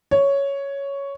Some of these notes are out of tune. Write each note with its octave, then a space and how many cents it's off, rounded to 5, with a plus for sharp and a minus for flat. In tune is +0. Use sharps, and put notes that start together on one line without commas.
C#5 +5